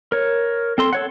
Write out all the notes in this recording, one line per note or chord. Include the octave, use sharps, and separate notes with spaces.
A#4 C#5
C4 A4 C6
A4 C#5 F#5